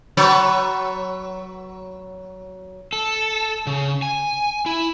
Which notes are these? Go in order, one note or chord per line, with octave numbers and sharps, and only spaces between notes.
F#3 B4 C#5
A4
C#3
G#5
E4